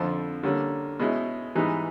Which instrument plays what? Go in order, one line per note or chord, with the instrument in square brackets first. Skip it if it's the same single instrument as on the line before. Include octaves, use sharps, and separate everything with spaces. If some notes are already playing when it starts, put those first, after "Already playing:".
Already playing: [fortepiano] F2 D3 F3
D3 G3 A#3 C#4
B2 G#3 C#4 E4
G#2 E3 G3 B3 D#4